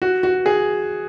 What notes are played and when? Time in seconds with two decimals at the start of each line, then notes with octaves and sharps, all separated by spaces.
0.02 F#4
0.23 F#4
0.46 G#4